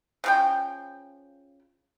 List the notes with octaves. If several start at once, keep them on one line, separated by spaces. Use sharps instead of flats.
C#3 F3 G5